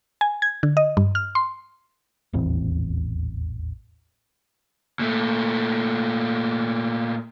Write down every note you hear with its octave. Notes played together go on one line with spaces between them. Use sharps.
G#5
G#6
D3
D#5
G2
F6
C6
D#1 A1 E2 C4
A#2 A3